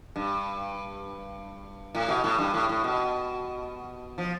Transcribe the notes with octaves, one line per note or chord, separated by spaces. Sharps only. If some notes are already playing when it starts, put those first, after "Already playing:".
G2
A2
B2
A2
G2
A2
A2
B2
F3